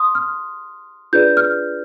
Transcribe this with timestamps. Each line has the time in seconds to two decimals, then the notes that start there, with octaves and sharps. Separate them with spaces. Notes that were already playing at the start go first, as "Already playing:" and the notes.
Already playing: C6 D#6
0.15 F6
1.13 D4 F4 G#4 B4 D5 G6
1.37 F6